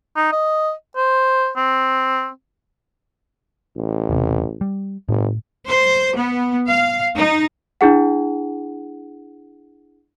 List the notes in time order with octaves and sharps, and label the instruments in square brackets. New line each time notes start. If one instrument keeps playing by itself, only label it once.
[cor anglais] D#4
D#5
C5
C4
[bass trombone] A1
[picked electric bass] E1 C3
G3
[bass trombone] G1 [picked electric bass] A2
[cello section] C5
B3
F5
D#4
[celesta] D4 E4 G#4 F#5